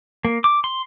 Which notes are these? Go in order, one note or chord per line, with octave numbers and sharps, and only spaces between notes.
A#3
D6
C6